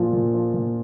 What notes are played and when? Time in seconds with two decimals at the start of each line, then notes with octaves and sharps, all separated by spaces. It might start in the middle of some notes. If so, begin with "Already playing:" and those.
Already playing: A#2 F3 F4
0.13 A#2
0.34 F3
0.54 A#2